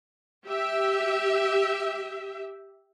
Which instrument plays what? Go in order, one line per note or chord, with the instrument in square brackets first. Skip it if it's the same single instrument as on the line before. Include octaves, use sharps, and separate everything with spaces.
[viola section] G4 E5